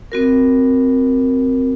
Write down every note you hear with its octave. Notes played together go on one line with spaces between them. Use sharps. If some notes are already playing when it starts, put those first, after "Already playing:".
C4 F#4 A#4